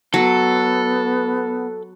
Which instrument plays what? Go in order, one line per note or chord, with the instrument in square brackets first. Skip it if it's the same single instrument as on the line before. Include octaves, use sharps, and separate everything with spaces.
[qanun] F#3 [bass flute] B3 [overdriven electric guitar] A4